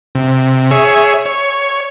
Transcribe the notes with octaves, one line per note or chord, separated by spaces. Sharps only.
C3
G#4 C#5 E5
C#5